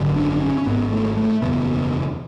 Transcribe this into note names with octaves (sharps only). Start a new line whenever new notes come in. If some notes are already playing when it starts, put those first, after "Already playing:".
Already playing: G#1 F#2 D3
D4
D4
C#4
C#4
G#1 G#2 B3
A3
A3
F#1 E2 B2 B3